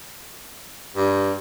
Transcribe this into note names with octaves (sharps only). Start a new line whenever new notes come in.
G2